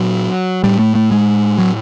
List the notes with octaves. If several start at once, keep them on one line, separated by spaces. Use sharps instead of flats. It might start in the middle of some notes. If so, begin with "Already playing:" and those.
Already playing: A#2 F#3
A2 G3
A3
A3
G#3
F#3